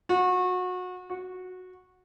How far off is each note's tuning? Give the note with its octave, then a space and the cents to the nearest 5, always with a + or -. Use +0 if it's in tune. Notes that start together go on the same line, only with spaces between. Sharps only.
F#4 -25
F#4 -10